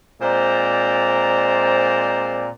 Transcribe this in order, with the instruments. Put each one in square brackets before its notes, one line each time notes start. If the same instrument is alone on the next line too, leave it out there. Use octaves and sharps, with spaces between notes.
[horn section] A#2 G#3 C4 C5 D5 A#5